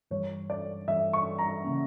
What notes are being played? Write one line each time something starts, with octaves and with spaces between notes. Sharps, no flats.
G2 E3 G3 C#5
D5
G2 E3 G3 E5
C#6
A#5
C#3 E3 A#3 C#4